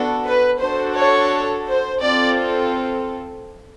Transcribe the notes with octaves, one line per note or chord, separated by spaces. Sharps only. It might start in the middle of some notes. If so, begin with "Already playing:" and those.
Already playing: B3 D4 F#4 A4
B4
D4 F#4 A4 C5
C#5
C5
C4 F4 A4 D5